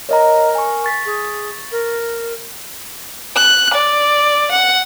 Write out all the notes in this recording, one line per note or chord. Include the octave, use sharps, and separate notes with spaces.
A#4 C#5 D#5 A#5
G#5 C#6
C#6 A6 B6
G#4
A#4
F#6
D5
F#5